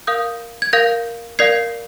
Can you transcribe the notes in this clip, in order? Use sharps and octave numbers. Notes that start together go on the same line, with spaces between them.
A#4 F5 D#6 G6
G#6
A#4 F5 G6 A#6
A#4 D5 F5 G#6 C7